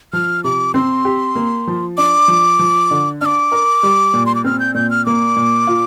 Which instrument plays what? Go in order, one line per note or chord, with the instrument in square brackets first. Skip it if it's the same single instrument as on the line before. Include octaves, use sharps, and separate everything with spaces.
[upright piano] F3 [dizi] F6
[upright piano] C3 [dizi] D6
[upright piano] C4 [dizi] C6
[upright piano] G4
A#3
F3
[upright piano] D4 [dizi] D6
[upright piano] F3
F3
D3
[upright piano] D4 [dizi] D6 F6
[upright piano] A#4
G3
A#2
[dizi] C6
D6
[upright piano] C4 [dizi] F6
[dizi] G6
[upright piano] A#2 [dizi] G6
[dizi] F6
[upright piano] A#3 [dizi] D6
[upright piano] A#2
F4